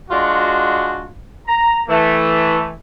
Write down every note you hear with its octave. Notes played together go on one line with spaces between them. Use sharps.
G#3 D4 F4 F#4
A#5
E3 A3